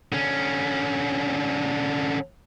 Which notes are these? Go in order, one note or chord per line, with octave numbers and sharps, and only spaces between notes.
D3 C#4